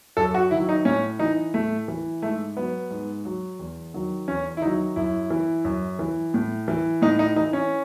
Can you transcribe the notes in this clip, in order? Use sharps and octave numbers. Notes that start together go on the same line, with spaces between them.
F#2 A4
F#4
D#3 F#3 E4
D#4
A2 C#4
E3 D#4
A2 A3
E3
G#2 A3
F#3 B3
G#2
F#3
E2
D#3 F#3
E2 C#4
E4
D#3 F#3 D#4
F#2 E4
E3
F#2
E3
A2
E3
A2 D#4
D#4
E3 D#4
C#4